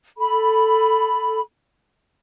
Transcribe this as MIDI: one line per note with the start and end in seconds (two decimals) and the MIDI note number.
0.17 1.40 69
0.17 1.40 83